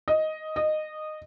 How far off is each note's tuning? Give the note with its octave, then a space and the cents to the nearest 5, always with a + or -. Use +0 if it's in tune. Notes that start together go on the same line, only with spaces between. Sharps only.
D#5 +5
D#5 -15